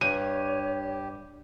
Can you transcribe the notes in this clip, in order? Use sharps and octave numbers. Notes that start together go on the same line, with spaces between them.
G2 G4 C#5 D#7